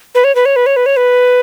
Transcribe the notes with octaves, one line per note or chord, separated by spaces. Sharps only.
B4
C#5
B4
C#5
B4
C#5
B4
C#5
B4